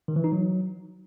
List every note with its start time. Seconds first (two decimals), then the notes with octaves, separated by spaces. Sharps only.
0.08 D#3
0.16 E3
0.24 D#4
0.32 F#3